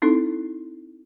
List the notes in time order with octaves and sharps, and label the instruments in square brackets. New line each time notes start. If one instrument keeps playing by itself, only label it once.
[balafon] C4 D#4 E4 A4